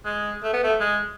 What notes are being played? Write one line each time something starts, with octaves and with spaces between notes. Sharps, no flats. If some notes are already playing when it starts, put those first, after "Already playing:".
G#3
A3
B3
A3
G#3